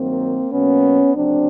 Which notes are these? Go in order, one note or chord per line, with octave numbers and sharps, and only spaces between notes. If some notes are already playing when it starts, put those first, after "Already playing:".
Already playing: G2 D#3 F#3 A#3 C4
B2 F#3 A#3 B3 C#4
D2 C#3 F#3 A#3 C4 D4